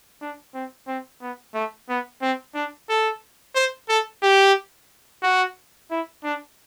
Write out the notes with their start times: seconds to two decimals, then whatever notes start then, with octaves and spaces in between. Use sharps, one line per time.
0.21 D4
0.54 C4
0.87 C4
1.21 B3
1.54 A3
1.89 B3
2.22 C4
2.55 D4
2.89 A4
3.55 C5
3.89 A4
4.22 G4
5.23 F#4
5.90 E4
6.24 D4